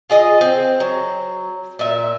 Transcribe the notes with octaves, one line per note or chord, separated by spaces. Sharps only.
F4 G#4 D#5
C4
F#3
A#2 E5